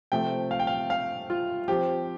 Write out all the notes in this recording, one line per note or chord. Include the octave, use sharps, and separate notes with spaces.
C3 F3 A3 G5
F5
G5
F5
F5
F4
F3 C4 G4